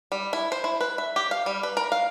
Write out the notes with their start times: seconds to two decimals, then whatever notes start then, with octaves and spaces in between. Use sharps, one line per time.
0.12 G3
0.33 E4
0.52 C5
0.64 E4
0.81 B4
0.98 E5
1.16 G4
1.31 F5
1.46 G3
1.63 B4
1.77 A#4
1.92 F5